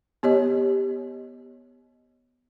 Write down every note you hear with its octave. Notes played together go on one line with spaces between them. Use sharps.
B3 G4 C#5 D#5